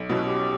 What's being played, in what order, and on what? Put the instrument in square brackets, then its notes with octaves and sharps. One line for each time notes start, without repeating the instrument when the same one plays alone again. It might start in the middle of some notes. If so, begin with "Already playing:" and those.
Already playing: [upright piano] B1
[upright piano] B2 F#3 C#4 E4 [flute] F#4
[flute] G4